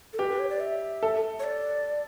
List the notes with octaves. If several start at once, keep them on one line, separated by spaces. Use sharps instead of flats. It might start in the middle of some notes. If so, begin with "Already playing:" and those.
A4
G4 B4
B4
C#5
D5
E5
A4
C#5
D5